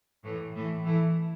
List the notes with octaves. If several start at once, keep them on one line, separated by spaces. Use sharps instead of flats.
A2 E3 A3
A2 E3 A3
E3 A3 E4